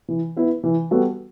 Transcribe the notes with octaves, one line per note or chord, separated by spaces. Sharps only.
E3
B3 E4 B4
E3
G3 B3 F#4 A4